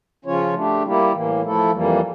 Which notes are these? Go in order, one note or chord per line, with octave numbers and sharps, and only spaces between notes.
C#3 F3 C#4 F4 C#5
A3 D4 G4
G3 A#3 E4 G4
A2 E3 A#3
F3 A3 E4 A4
F2 E3 G3 A#3